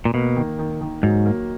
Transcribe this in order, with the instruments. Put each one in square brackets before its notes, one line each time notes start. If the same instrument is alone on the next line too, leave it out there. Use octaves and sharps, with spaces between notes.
[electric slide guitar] A#2
[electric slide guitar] B2 [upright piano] A#3
[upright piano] D#3
D#3
D#3
[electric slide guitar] G#2 [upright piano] F#3
[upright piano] A#3